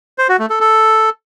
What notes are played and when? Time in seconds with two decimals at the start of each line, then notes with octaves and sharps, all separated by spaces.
0.18 C5
0.29 F#4
0.39 A3
0.50 A4
0.60 A4